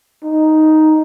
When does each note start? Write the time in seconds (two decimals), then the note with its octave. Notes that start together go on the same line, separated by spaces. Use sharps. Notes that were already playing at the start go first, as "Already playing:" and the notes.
0.24 D#4